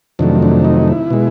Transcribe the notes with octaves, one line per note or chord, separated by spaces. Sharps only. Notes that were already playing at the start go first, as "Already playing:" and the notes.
F2 C3 D#3 F#3 A3 D4
D4
D#4
E4
B2 G#3